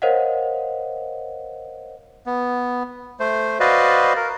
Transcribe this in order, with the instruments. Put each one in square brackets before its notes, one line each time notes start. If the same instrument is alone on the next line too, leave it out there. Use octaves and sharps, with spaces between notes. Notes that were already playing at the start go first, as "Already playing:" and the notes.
[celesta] A#4 C5 C#5 D#5 F5 F#5
[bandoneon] B3
A3 C5
F#4 B4 C5 D5 D#5 F5
A#4